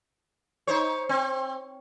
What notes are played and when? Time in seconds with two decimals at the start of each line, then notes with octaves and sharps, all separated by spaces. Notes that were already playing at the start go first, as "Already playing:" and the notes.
0.67 D#4 C5 C#5
1.09 C4